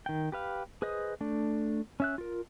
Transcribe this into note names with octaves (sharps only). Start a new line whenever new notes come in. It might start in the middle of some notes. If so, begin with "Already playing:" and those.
D#3 G5
G4 B4 F5
G#4 B4 C5 D#5 D#6
A3 D4
C#4 E5 F#6
F4 A#4